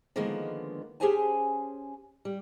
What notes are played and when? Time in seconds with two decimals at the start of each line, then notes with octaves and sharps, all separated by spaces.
0.16 D3 D#3 F3 G#3 A#3 B3
1.00 C#4 G4 G#4 C5 G#5 A5
2.25 G3